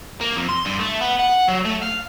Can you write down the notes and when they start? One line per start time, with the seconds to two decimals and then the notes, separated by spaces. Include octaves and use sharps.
0.21 A#3
0.36 F2
0.49 C6
0.65 G2
0.79 A3
1.01 B3
1.20 F#5
1.49 F#3
1.66 A3
1.83 F5